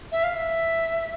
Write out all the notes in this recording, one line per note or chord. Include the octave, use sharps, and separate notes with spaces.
E5
F5
E5